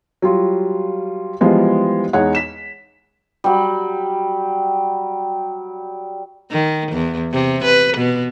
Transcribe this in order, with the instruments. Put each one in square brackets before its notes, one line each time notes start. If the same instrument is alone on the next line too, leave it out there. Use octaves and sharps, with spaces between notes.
[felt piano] F#3 G3 F4
E3 F3 G3 G#3 B3
E2 G#3 D#4 G#4 C#5 F#5
B6 E7
[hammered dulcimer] F#3 G3
[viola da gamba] D#3
E2
C3
B4
B2